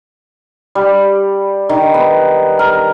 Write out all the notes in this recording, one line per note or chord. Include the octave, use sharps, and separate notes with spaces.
G3
D#3
B3
A#4